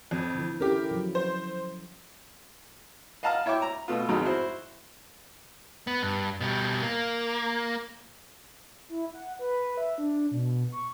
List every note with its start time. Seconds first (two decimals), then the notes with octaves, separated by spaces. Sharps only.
0.11 F2
0.35 D3 E3
0.60 C#4 E4 G4 A4 A#4
0.91 F3 F#3
1.15 C5
3.23 D#5 F5 F#5 A5 A#5 F6
3.46 E4 C#5 E5 G5 D6
3.62 A#5
3.88 B2 A3 B3 F4
4.09 G#1 F2 D#3 F#3 G#3
4.24 E4 F#4 C5
5.87 B3
6.03 G2
6.40 B2 G3
6.82 A#3
8.89 E4
9.14 F#5
9.39 B4
9.77 E5
9.98 D4
10.31 B2
10.72 C#6